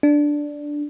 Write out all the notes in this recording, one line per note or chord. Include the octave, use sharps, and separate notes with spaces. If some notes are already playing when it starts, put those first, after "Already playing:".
D4